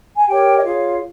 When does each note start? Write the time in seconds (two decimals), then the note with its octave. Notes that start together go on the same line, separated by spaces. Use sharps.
0.16 G#5
0.28 G4 A#4 C#5 G5
0.56 D#5
0.64 F4 G#4 C#5 F5